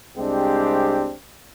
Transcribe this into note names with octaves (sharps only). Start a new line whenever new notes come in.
C2 G#3 C4 D4 G4